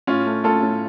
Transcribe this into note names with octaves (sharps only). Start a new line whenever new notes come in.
A2 C#4 F4
A3
A2 F4 A4
A2